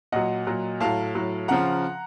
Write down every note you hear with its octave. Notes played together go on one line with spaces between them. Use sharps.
A#2 F#3 D#5 F#5
A#2 F#3
A2 F#3 F5 A5
A2 F#3
C#3 F3 F#5 A#5